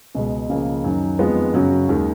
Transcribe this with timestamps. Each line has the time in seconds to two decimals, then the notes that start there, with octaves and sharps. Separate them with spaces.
0.15 C#2 B2 G#3
0.50 C#2 C#3 F3 A#3
0.84 F#2 D#3 F#3
1.19 F2 D#3 G#3 B3 F4
1.54 F#2 C#3 F#3 C#4 F#4
1.89 D#2 D#3 G#3